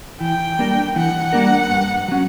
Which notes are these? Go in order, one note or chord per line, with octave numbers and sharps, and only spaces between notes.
E3 G5
G3 A#3 D4 A#4
E3 F#5
G3 A#3 D4 A#4
G2
F#3 C#4